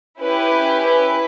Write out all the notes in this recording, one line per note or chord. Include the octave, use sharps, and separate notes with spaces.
C#4 E4 G4 B4
B4